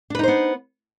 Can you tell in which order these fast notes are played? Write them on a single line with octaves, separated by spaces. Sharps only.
D4 B4 D#4 C5 B3